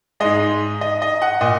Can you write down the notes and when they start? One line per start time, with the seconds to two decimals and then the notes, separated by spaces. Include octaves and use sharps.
0.20 G#2 G#3 D#5
0.81 D#5
1.02 D#5
1.22 F#5
1.41 A#2 D#5